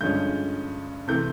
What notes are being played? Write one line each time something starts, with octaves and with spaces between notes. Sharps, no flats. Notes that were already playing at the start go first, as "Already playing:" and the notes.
G2 D3 F3 G#3 C#4 G6
C3 E3 A3 C4 G6